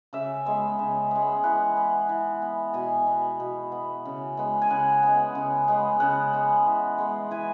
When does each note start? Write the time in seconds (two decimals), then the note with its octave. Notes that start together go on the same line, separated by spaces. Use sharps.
0.13 C#3 E5
0.45 G#3 B3
0.79 C#3
1.11 G#3 B3
1.44 E3 F#5
1.76 B3
2.09 E3
2.42 B3
2.74 B2 G#5
3.07 B3
3.40 B2
3.72 B3
4.05 C#3
4.37 G#3 B3
4.62 G#5
4.70 C#3 F#5
5.03 G#3 B3
5.35 C#3
5.68 G#3 B3
6.00 C#3 F#5
6.33 G#3 B3
6.66 E3
6.98 G#3 B3
7.31 E3 G#5